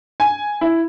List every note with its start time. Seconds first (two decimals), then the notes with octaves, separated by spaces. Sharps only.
0.20 G#5
0.61 E4